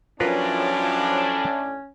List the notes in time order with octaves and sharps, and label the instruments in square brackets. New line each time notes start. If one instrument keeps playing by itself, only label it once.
[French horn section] A2 D4 [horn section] F3 F#3 [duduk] C#4 [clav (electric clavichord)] F4 A#4 B4